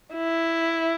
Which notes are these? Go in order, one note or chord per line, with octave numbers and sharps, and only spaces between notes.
E4